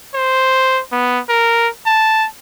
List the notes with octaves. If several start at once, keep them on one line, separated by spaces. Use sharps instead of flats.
C5
B3
A#4
A5